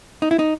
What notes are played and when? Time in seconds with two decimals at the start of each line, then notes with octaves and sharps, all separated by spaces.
0.22 D#4
0.31 E4
0.39 D#4